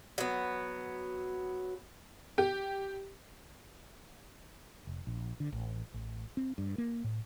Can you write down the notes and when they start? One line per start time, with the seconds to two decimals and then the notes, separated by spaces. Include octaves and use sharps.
0.18 F#3 B3
2.38 G4
4.87 F1
5.07 A#1
5.40 D3
5.52 A1
5.94 A1
6.37 C4
6.58 G2
6.78 A#3
7.04 A2